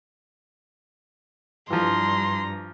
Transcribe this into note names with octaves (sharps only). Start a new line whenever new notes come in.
G2 E3 F3 A#5 C6